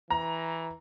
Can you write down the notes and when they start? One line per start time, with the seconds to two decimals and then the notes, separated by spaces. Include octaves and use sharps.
0.10 E3 A#5